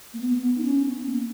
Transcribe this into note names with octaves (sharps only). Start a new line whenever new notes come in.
A#3
B3
B3
D#4
C#4
B3
A#3